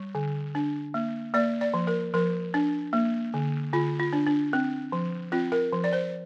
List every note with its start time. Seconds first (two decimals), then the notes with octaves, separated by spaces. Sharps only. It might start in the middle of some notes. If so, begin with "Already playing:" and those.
Already playing: G3
0.15 D3
0.55 D4
0.94 A#3
1.34 A#3 D5
1.61 D5
1.74 F3
1.87 A#4
2.14 F3 A#4
2.54 D4
2.93 A#3
3.34 D3
3.73 D3 F4
3.99 F4
4.13 D4
4.27 D4
4.53 C4
4.92 F3
5.32 C4 F4
5.52 A#4
5.72 F3
5.84 D5
5.93 C5